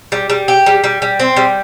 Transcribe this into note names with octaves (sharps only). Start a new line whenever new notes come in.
G3
G3
G4
G3
G3
G3
C4
G3